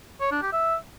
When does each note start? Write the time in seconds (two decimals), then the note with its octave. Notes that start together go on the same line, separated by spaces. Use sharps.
0.21 C#5
0.31 D4
0.42 G4
0.52 E5